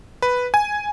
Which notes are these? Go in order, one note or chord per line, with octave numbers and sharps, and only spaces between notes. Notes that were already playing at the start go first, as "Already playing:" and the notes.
B4
G#5